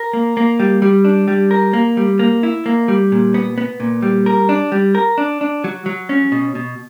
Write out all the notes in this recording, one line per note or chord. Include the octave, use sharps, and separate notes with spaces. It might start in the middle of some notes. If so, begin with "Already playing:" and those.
Already playing: A#4
A#3
A#3
G3
G3
D4
G3
A#4
A#3
G3
A#3
E4
A#3
G3
A#2
B3
B3
A#2
G3
A#4
D4
G3
A#4
D4
D4
F#3
F#3
C#4
B2
B2